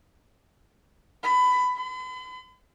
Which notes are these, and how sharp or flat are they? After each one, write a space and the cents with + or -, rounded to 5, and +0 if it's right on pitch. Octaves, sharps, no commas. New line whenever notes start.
B5 +20
B5 +45